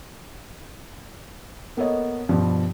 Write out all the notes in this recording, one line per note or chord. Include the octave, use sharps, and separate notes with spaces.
A#3 B3 A4 C#5 D#5
G2 B2 F3 G3